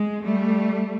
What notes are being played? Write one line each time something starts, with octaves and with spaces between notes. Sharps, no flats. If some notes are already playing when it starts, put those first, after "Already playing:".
Already playing: G#3
G3 A3